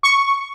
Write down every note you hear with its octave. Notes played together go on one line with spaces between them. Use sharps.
C#6